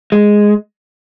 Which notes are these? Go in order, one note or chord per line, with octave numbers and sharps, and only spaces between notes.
G#3